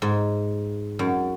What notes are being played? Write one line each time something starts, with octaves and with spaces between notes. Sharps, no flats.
G#2
F#2